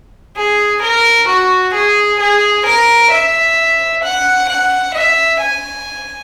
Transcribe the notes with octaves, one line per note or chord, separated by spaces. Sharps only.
G#4
A#4
F#4
G#4
G#4
A#4
E5
F#5
F#5
E5
G#5